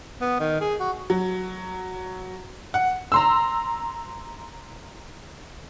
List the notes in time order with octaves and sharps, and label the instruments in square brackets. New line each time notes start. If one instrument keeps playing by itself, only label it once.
[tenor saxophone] B3
D#3
G#4
F#4
[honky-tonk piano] F#3
F#5
A#5 C6 E6